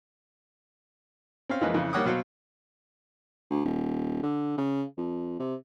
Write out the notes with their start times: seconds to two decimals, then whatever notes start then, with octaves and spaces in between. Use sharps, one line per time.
1.49 C4 C#4 F5
1.61 F2 E3 F3 G#3 A#3 B4
1.74 F2 C#3 E3
1.93 G3 A#3 C#5 F#5 D6 D#6
2.05 B2 F#3 C5 F5
3.50 D2
3.65 D#1
4.23 D3
4.58 C#3
4.97 F2
5.40 C3